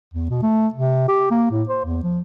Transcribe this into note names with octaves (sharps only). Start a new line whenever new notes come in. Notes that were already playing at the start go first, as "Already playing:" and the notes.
E2
B2
A3
C3
G4
A#3
A2
C5
E2
F3